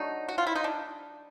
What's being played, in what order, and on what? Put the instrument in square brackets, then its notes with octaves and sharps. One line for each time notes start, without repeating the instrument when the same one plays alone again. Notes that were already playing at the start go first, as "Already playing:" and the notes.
Already playing: [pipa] F#3 A3 D4 D#4
F#4
F4
E4
D#4
D4